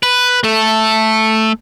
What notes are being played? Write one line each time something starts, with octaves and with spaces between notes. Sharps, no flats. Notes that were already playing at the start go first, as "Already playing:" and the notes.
B4
A3 A4